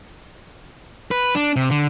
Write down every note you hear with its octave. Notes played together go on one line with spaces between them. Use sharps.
B4
D4
C3
D3